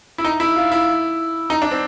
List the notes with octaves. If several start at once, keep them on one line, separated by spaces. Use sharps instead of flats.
E4
D#4
E4
F4
E4
D#4
D4
C4